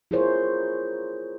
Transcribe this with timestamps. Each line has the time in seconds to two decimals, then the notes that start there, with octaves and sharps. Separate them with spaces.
0.11 E4 F4 G#4 A#4 C5 C#5